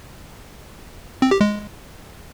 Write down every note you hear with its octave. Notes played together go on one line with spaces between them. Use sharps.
C4
G4
G#3